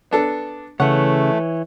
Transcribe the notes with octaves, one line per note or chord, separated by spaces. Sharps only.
B3 D4 A4
C#3 E3 A3 C#5 F#5